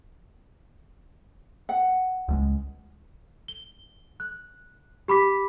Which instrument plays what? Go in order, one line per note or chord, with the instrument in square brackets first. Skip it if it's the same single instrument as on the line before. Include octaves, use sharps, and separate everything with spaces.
[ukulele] F#5
[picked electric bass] C#2 G3 G#3
[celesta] G7
F#6
G4 B5 D6 B6